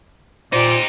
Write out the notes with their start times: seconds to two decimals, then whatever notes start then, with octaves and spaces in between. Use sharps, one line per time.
0.53 A#2 D#4 G4 C5 D5